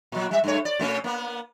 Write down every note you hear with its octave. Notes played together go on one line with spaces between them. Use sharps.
A#2 F#3
G3 E5
G2 A3 C#5
D5
B2 A3 C#4
A#3 B3